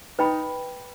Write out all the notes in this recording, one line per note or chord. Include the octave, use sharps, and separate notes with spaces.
D#4 B4 D#5 G5 B5